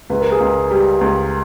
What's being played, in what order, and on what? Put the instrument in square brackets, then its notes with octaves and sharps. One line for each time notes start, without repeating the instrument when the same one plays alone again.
[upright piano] C#2 [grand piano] B4
[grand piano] A#4
G#4 B4
[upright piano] C#2
G3
C#2